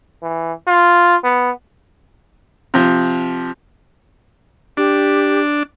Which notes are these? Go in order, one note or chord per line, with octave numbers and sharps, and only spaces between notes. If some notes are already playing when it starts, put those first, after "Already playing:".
E3
F4
B3
C3 F3
D4 G4